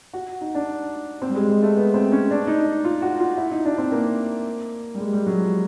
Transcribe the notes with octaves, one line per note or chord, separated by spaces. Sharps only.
F#4
D#4
D4
C4
G3
G#3
G#3
A3
B3
C4
C#4
D4
D#4
F4
F#4
F4
E4
D#4
D4
C4
A#3
G3
G#3
G3
F#3
F3